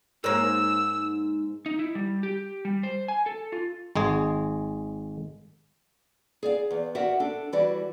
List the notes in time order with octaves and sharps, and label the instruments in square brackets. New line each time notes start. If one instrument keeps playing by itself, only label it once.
[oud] G#2 A#3 [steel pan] A#4 C#5 [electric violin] E6
[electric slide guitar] D#4
E4
G3
G4
G3
C5
G#5
A4
F4
[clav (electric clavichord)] G#1 G#3 G#4
[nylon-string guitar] G#4 D5 F5
E2
F#4 G4 A#4 D5 E5 F#5
D4 A4
E3 G3 F#4 D5